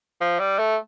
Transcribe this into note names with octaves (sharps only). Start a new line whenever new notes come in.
F3
G3
A3